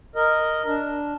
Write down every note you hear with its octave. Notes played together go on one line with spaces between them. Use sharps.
A#4 D#5
D4